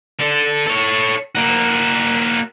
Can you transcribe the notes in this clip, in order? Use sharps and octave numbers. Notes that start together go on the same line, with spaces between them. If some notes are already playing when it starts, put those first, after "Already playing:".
D3 A4
A4 C#5
A#3 F#4